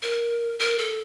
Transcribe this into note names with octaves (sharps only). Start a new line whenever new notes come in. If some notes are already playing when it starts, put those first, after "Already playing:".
A#4
A#4
A4